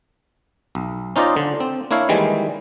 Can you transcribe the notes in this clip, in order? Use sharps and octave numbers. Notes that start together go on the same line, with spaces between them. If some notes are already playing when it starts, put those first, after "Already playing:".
B1
C#4 D#4 F4 C5 D5 D#5
D3
C4
A#3 D4 E4 C#5 F5
D#3 E3 G3 G#3